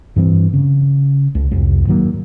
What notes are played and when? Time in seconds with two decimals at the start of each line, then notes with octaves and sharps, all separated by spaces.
0.16 G2 E3 C4
0.54 C#3
1.35 C#2
1.51 C2 F2
1.87 G#2 D#3 F#3 A#3